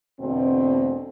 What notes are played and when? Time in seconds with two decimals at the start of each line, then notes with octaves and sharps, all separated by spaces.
0.20 E2 B2 D3 A3 C4